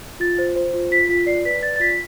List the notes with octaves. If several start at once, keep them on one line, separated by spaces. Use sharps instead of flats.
F4 A6
C5
C5
F4
F4 B6
F4 B6
D5 C7
B4 B6
D5 A6
A6
F4 B6